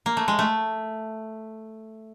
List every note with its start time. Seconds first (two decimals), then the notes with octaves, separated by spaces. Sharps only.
0.06 A#3
0.17 A3
0.28 G#3
0.39 A3